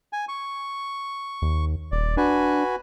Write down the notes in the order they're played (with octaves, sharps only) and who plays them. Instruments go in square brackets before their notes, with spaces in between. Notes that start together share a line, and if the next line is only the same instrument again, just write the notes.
[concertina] G#5
C#6
[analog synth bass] D#2
[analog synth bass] D#1 [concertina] D5
[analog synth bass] D4 [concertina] F#4 B4 G#5